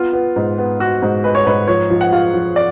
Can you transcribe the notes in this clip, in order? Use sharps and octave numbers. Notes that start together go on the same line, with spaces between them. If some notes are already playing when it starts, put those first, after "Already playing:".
Already playing: B3 F4
B3
G#2
B3
B3 F#4
G#2
G#3 B4
C#5
G#2 B4
F3 C#5
F3
F#5
F4 F5
F3
D5